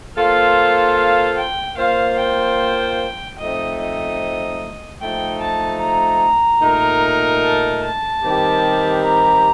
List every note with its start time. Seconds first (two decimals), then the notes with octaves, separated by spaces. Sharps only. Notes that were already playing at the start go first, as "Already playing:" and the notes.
0.16 A#3 F4 A4 C5 F5
0.97 F5
1.37 G5
1.78 A#3 F4 C5 F5
2.19 G5
3.39 F3 A3 C4 D#4 D#5
3.80 D#5
5.00 F3 A3 D#4 G5
5.41 A5
5.81 A#5
6.61 A#2 A3 D#4 A#4
7.43 A5
7.83 A5
8.23 D#3 G3 C4 G4
9.03 A#5